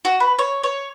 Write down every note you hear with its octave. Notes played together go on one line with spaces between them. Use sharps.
F#4
B4
C#5
C#5